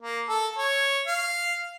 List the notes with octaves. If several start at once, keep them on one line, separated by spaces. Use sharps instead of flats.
A#3
A4
C#5
F5